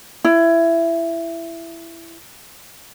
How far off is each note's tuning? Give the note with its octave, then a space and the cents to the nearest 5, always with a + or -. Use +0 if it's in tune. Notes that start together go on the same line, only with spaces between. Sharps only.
E4 +15